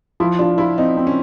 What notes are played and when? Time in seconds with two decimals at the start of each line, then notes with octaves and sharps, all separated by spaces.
0.20 F3 E4
0.39 D4 F4
0.58 E4 F4
0.78 C4 D#4
0.97 C4
1.07 C#4